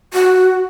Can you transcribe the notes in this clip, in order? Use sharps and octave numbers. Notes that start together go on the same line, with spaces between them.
F#4